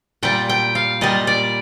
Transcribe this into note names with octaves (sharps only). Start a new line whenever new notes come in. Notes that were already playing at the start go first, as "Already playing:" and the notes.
A#2 G3 G5
G5
F5
A#2 G3 D#5
D5